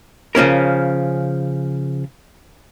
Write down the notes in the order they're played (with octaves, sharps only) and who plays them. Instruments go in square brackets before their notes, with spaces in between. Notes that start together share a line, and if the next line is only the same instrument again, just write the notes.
[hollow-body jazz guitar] C#3 F3 C#4 A#4